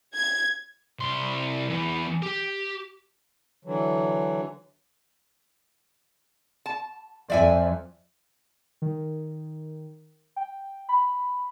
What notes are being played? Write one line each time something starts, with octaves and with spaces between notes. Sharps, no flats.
G#6
C2 C6
E3 B3
G4
D3 E3 F#3
A5
F2 D5 E5 G#5
D#3
G5
B5